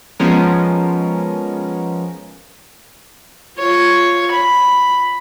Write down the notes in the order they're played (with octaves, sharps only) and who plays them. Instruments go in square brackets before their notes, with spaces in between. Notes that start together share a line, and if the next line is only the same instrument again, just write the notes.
[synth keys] F3 G#3 B3 C#4 A#4
[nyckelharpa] F4 C#5
B5